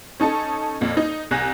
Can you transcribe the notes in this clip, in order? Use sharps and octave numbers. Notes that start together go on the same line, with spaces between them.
C#4 D#4 A4 A5
F2 A#2
D#4
C2 G#5 F#6 A#6